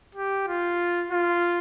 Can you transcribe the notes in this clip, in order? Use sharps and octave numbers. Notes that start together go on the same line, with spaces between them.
G4
F4
F4